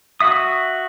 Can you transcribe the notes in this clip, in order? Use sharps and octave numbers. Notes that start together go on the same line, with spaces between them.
F#4 E5 D#6